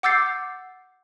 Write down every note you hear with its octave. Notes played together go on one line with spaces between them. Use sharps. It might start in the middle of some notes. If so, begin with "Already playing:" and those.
F#5 D6 E6 G6 A6 C7